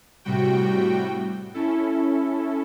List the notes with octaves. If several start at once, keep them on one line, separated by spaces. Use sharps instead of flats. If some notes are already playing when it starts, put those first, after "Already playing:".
A2 C3 G3 F#4 G5
C#4 E4 A4